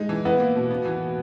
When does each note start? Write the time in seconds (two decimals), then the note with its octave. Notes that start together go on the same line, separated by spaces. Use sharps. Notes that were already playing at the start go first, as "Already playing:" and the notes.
Already playing: G#3 D#4
0.09 E3
0.25 B3 E4
0.40 A#3
0.55 B2
0.71 B3
0.85 E3